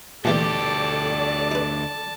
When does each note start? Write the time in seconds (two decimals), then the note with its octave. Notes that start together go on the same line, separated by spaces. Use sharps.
0.25 D2 A#2 E3 A3 G4 A4 D5 A5
1.51 D#4 B4